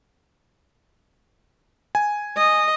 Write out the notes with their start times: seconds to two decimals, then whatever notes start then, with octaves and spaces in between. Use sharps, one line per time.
1.95 G#5
2.37 D#5